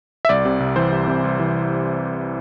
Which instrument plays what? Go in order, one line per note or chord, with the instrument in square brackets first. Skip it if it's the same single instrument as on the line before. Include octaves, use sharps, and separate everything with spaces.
[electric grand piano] E5
C2 D5
C3
C2
E3 C5
C2
C3
C2
E3